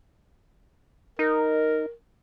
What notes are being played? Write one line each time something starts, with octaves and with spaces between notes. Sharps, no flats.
D#4 A#4